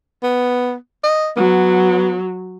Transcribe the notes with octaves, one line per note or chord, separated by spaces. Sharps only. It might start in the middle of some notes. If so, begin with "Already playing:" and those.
B3
D#5
F#3 B3